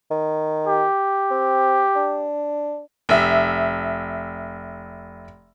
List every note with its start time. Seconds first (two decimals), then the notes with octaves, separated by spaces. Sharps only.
0.11 D#3
0.67 G4
1.31 C4
1.96 D4
3.09 F1 E5